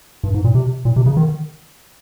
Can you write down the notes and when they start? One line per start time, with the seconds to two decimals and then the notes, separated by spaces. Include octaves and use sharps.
0.24 G2
0.34 G#2
0.44 A#2
0.55 C3
0.85 A#2
0.96 C3
1.06 C#3
1.17 D#3